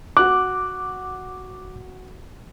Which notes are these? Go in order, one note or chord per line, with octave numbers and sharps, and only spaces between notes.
F#4 D6 F#6